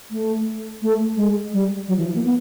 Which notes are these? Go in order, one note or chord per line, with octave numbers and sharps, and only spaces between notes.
A3
A3
G#3
G3
F#3
E3
F3
A#3
B3